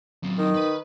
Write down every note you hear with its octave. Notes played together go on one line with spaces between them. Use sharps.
F#3 C4
D#3
B4 B5